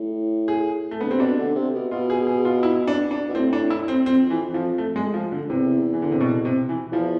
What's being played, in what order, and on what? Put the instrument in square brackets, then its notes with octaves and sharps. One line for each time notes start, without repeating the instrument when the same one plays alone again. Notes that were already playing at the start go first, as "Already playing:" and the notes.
Already playing: [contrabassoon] A2
[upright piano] G#4
A3
[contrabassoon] D3 [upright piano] B3
[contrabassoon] C3 [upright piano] C4
[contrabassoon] B2 [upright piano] D4
[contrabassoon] D3
C3
B2
[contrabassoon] B2 [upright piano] F4
[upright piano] G#4
G#4
F4
E4
D4
D4
[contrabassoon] B2
[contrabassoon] A2 [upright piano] C4
[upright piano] D4
E4
C4
[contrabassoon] F2 [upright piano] C4
[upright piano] E3
F3
A3
G#3
F3
D3
[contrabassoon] E2 [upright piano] C3
[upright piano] E3
D3
C3
B2
C3
E3
[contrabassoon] E2 [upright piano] F3